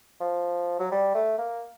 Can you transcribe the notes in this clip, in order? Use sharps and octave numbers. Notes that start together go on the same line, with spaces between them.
F3
F#3
G3
A3
A#3